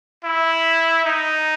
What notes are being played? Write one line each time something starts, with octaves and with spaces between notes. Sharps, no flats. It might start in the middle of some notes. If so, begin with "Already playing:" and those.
E4
D#4